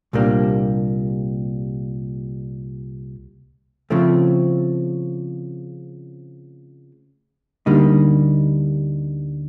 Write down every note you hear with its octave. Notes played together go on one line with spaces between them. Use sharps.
C2 A#2 G3 A#3 D4
C#3 F3 A3 C4
D2 D3 G3 A#3 D#4